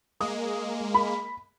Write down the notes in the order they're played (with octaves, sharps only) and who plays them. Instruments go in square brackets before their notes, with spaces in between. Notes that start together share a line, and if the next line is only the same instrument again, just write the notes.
[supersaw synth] G#3 A#3 [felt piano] D#6
[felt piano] B5